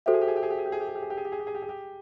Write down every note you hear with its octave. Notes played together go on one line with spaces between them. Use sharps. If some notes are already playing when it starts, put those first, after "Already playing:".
F#4 G4 A4 C5 E5
G#4
G4
G#4
G4
G#4
G4
G#4
G4
G#4
G4
G#4
G4
G#4
G4
G#4
G4
G#4
G4
G#4
G4
G#4
G4